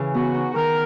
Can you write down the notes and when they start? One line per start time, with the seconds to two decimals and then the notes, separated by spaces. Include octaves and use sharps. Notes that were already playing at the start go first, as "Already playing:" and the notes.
Already playing: C#3 E3
0.14 B3 F#4
0.34 D#4
0.54 D#3 A#4